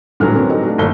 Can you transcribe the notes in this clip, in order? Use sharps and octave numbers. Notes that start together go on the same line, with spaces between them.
D#1 A2 D3 E3 F#3 F6
C4 C#4 A#4
D#4 G4 A4
A3 D4 F#4
G1 A#2 D#3 A4 G7